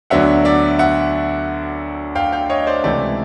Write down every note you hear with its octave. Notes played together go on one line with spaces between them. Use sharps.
D2 D3 F#3 B3 D4 E5 F#5
D5 E5
E5 F#5
F5 G5
F5 G5
C#5 D#5
C5 D5
C#2 C3 E3 A3 D5 E5